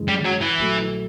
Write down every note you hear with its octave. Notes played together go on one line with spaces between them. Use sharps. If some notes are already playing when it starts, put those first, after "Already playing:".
Already playing: F#2 C#3 E3 G#3
G3
F#3
E3
A#1 A#2 F#3 A3